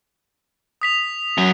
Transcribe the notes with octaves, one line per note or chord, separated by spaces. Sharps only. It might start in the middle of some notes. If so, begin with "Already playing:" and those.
D#6 B6 F7
F#2 F#3